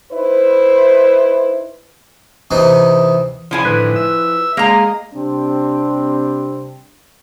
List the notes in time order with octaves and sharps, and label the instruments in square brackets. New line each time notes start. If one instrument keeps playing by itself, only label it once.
[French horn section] D#4 E4 B4 C5
[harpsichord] C3 E3 D#4
[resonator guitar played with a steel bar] F3 E4 G#5
[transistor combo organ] A2 D3 D#3 [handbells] B4 F#6 B6
[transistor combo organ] E5 E6
[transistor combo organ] G#3 D#5 [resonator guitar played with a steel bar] A#3 A#5
[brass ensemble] C3 G3 C4 D4